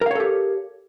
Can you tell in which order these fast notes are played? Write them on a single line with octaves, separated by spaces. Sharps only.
A#4 F5 C#5 A4 G4